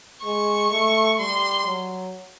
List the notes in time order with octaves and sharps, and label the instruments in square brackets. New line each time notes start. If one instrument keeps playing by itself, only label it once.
[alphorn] G#3 [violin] C#6
[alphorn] A3
[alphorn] G3 [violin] C6
[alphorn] F#3